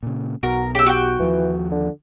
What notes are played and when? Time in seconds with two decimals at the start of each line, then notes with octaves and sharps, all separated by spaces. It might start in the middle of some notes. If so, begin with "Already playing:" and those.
0.03 A#2 C#3
0.43 B1 B2 F#4 A#4
0.75 C#3 G4 E6
0.86 F#4 G4 G5
1.20 D#2 E3 F3
1.72 D3